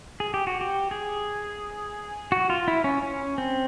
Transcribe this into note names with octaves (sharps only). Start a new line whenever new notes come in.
G#4
G4
F#4
G4
G#4
F#4
F4
E4
C#4
C#4
C4